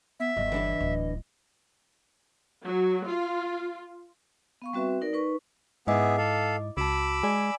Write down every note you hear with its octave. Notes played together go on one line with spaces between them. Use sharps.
B3 E5
G1 D#2 D#5
E3 D4 B4
D1
F#3
F4
B3 F5 C#6
G3 C4 F#4 B4 E5
D#4 A#4 D5
D#4 B4 C#6
G#2 B3 E4 G#4 D#5 E5 D6
A4 F5
C#2 F#4 A5 B5 D6 E6
G#3 D5 G#5